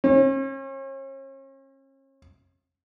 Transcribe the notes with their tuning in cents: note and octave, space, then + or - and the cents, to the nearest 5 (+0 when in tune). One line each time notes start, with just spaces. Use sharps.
C#4 -40